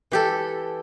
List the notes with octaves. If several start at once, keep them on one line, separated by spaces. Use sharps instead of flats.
E3 G4 A4